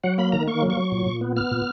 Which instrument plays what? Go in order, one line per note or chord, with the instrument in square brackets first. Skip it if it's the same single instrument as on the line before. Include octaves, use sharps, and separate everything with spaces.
[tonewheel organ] F#3 F#5
A#3 B5
D#3 A#5
A#3 C#6
F#3
C#6
F#3
A#2
A#2
B3
B3 F6
A#2